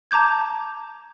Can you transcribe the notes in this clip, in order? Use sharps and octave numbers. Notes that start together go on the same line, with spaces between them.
A5 A#5 D6 G6 G#6